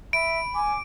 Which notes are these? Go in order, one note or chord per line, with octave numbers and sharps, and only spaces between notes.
E5 B5 D7
G#5 D6